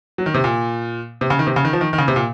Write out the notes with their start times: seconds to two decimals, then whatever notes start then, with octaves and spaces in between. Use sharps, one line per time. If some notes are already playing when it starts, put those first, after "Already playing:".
0.18 F#3
0.26 D#3
0.34 C3
0.44 A#2
1.21 C3
1.30 C#3
1.39 D#3
1.47 C3
1.56 C#3
1.65 D#3
1.73 F3
1.81 D#3
1.93 D#3
1.98 C#3
2.08 C3
2.16 A#2